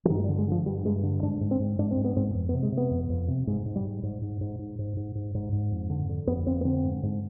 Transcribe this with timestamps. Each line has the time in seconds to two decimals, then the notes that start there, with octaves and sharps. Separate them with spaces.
0.05 F3
0.10 G2 D#3
0.18 G#3
0.24 G3
0.29 D3
0.38 G#3
0.48 D3 F3
0.66 G2 G3
0.85 G2 G#3
1.03 D3
1.23 G#2 D4
1.41 G#2
1.51 C4
1.60 G#2
1.79 G#2 D4
1.91 C4
1.97 G#2
2.04 B3
2.16 G#2 C4
2.35 F2
2.49 B3
2.54 C3
2.63 G#3
2.72 C3
2.77 B3
2.91 F2
3.09 F2
3.28 C3
3.47 G#2 G#3
3.66 G#2
3.76 G3
3.84 G#2
4.03 G#2
4.22 G#2
4.41 G#2
4.59 G#2
4.79 G#2
4.97 G#2
5.15 G#2
5.35 G#2
5.52 G#2
5.71 F2
5.90 D3
6.09 D3
6.27 F2 B3
6.47 F2 C4
6.61 B3
6.65 D3 C4
6.84 G#2
7.03 G#2